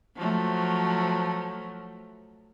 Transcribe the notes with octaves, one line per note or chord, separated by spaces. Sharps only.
F3 F#3 A3